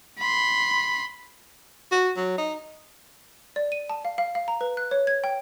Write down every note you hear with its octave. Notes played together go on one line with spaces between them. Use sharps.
B5 C6
F#4
F#3
D#4
D5
D#7
A5
F5
F5
F5
A#5
B4
F#6
C#5
G#6
G5